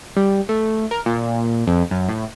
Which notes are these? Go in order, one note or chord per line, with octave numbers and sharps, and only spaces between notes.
G3
A3
A#4
A#2
F2
F#2
A2